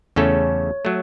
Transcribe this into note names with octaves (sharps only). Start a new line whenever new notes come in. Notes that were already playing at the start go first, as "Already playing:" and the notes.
E2 C#3 A3 C#4 A4 C#5
F#3 A3